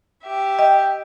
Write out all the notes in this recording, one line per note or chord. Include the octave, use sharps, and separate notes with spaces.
G4 E5
D#5 G5